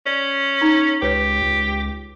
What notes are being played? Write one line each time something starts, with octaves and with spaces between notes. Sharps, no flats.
C#4 D5
D#4 A#5
C#2 G4 B4 C#5
C#2